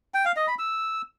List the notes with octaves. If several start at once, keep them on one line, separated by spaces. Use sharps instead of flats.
G5
F5
D#5
B5
E6